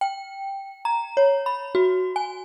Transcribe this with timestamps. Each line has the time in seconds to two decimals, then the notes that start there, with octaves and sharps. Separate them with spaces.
0.01 G5
0.85 A#5
1.17 C#5
1.46 B5
1.75 F#4
2.16 G#5